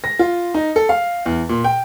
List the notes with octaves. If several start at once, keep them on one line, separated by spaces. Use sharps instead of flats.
A#6
F4
D#4
A4
F5
E2
A#2
G5